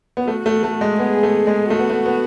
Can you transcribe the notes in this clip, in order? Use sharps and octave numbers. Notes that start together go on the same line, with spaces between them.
B3
A3 F#4
A3
A3
G#3
B3 G#4
A3
G#3
A3 F#4
B3
A3
B3